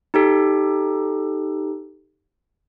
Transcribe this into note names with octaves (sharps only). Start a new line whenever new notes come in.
D#4 G4 A4